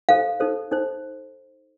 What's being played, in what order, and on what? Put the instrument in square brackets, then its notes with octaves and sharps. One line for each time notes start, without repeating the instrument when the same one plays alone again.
[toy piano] D#4 A4 C5 F5
D#4 A4 C5
D#4 A4 C5